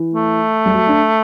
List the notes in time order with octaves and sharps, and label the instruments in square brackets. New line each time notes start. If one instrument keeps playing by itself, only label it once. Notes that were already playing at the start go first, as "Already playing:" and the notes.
Already playing: [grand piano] E3
[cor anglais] A3
[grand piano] G3
F#3
D4